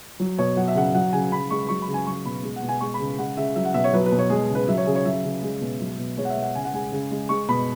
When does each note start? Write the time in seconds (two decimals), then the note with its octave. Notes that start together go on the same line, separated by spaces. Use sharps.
0.20 F#3
0.38 B2 C#5
0.56 F#3 F#5
0.68 E5
0.75 C#3 F#5
0.94 F#3 F#5
1.13 C#3 G#5
1.32 C#3 B5
1.51 G#3 C#6
1.69 F#3 C#6
1.82 B5
1.88 C#3
1.94 G#5
2.07 F#3 C#6
2.25 B2 B5
2.43 G#3
2.56 F#5
2.63 B2
2.69 G#5
2.81 G#3 C#6
2.94 B5
3.00 C#3
3.18 G#3 F#5
3.37 C#3 E5
3.56 F#3 E5
3.65 F#5
3.74 B2 E5
3.84 C#5
3.93 F#3 B4
4.06 B4
4.12 B2
4.19 C#5
4.30 G#3 G#4
4.50 C#3
4.55 B4
4.68 F#3 E5
4.77 C#5
4.86 C#3 G#4
4.95 C#5
5.05 F#3 E5
5.24 C#3
5.43 G#3
5.61 B2
5.80 F#3
5.98 B2
6.17 G#3 C#5
6.25 F#5
6.30 E5
6.37 B2
6.43 F#5
6.55 C#3 G#5
6.65 F#5
6.74 G#3 G#5
6.92 C#3
7.11 G#3
7.29 G#3 C#6
7.49 B2 B5